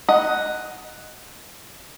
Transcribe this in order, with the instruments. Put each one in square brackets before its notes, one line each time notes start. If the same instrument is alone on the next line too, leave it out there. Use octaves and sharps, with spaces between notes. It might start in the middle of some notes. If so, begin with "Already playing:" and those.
[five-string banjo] D#5 F#5